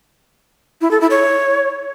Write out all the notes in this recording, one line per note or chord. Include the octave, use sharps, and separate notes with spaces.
E4
A4
E4
C#5